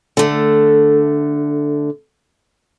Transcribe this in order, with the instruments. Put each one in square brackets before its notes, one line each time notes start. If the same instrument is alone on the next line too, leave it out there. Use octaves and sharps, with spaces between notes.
[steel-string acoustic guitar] D3 A3